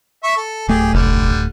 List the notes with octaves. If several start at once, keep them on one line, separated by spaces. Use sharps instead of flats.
E5 C#6
A4
D1 A3 G4 G#4
F1 D3 G3